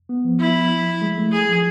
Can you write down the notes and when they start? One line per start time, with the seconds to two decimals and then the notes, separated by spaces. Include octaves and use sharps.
0.09 B3
0.24 F3
0.40 E4
1.02 G#3
1.18 A3
1.32 G#4
1.48 F3